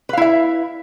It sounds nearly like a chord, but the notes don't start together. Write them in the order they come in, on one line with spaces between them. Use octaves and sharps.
B4 F5 E4 E5